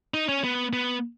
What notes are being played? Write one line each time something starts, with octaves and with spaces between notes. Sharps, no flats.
D#4
C#4
B3
B3